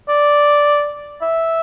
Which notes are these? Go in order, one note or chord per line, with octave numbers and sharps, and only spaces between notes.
D5
E5